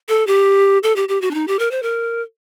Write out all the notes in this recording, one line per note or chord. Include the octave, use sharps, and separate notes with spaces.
A4
G4
A4
G4
G4
F#4
D4
D#4
G4
A#4
C5
A#4